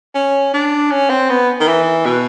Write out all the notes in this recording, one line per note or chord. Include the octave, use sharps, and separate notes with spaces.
C#4
D4
C#4
C4
B3
D#3
E3
B2